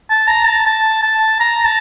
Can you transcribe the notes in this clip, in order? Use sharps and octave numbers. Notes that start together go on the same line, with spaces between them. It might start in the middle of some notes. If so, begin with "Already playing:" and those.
A5
A#5
A5
A5
A5
A#5
A5